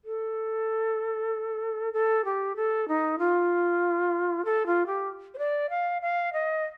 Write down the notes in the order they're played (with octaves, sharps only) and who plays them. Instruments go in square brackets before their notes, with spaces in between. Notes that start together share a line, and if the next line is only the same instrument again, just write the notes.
[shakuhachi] A4
A4
G4
A4
D#4
F4
A4
F4
G4
C5
D5
F5
F5
D#5